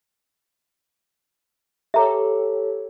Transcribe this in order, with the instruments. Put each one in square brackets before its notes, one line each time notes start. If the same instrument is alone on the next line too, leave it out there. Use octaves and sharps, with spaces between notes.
[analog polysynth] G4 A4 C#5 [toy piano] E5 A#5